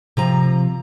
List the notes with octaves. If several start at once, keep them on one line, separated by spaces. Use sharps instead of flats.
C3 F3 A#5